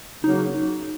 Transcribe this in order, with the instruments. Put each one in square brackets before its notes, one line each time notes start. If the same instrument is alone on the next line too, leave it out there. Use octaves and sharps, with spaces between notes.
[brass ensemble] C#3 F#3 A#3 [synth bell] D#4